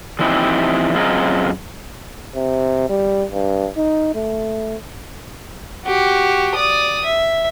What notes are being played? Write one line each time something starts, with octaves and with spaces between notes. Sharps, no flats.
E3 F3 C4 D#4 E4 G4
F#2 C4 F4 G#4 D#5 A#5
C3
G3
G2
D#4
A3
F#4 G4
D5 D#6
E5